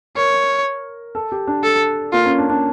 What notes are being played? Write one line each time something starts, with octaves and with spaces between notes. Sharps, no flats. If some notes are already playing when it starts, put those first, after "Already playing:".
A#4 C#5
A4
G4
D4
A4
A#3 F4
C#4
D4
D4